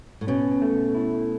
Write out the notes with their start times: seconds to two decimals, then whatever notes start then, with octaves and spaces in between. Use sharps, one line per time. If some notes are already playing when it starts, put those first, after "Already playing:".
0.21 A2
0.27 B2 C#4
0.62 A3
0.95 E4